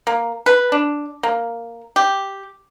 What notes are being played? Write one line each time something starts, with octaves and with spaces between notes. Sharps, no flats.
A#3
B4
D4
A#3
G4